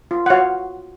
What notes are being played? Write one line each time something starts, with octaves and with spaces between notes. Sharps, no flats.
F4
F#5
F#4 C#5 F5